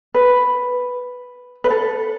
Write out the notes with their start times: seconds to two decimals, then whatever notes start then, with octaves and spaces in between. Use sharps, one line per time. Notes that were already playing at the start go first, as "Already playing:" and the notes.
0.14 B4
1.64 B4
1.70 A4